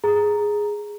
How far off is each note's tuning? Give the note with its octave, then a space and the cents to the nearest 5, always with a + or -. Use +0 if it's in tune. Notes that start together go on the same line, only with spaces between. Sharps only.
G#4 +0 A#5 +0